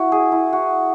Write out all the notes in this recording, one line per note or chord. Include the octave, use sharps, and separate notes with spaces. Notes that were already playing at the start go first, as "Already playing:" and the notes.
Already playing: E4 F#4
G#4
E4
F#4